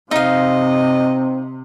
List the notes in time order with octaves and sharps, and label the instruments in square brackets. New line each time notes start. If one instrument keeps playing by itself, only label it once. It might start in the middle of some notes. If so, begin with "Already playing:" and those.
[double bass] C3 [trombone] C4 [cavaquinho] D#4 F5 [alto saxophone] D#5